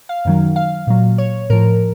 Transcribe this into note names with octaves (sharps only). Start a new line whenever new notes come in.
F5
F#2 D#3 F#3
F5
A#2 F#3
C#5
A2 F3 A#4